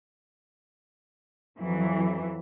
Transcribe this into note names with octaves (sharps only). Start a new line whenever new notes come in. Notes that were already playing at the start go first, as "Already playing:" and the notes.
F2 E3 F#3